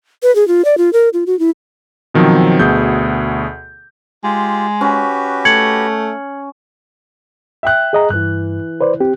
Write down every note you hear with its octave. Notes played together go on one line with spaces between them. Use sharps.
B4
G#4
F4
D5
F4
A#4
F4
F#4
E4
B2 D#3 F3 F#3 C4
D2 B2 G#4 G6
G#3 F4 G4
C#4 F#4 G4 B4
A3 G#6 C#7 F#7
E5 G5 F#6
G#4 D#5 A#5
G2 E3 F#6
B4 C5 D5
C4 G4